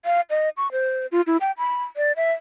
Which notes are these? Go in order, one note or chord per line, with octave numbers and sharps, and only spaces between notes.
F5
D#5
C#6
C5
F4
E4
G5
B5
D5
E5